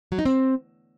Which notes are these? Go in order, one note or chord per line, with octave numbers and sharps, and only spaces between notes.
F#3
D#4
C4